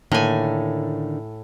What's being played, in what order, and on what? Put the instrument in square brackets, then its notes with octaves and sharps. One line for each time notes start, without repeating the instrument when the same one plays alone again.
[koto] A2 G#5 [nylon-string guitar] D3 D#3 A#3